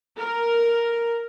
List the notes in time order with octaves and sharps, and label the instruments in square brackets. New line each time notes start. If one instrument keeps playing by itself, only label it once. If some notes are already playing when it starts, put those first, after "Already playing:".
[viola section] A#4